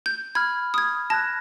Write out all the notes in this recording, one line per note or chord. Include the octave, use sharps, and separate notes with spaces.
G6
B5 F6 G#6
D#6 G#6
A5 F#6 G#6 A#6